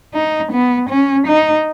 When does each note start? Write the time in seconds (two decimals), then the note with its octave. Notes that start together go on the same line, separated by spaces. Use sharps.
0.14 D#4
0.52 B3
0.90 C#4
1.27 D#4